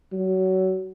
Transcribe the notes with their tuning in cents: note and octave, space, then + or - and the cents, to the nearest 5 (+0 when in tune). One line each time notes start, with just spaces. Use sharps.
F#3 +25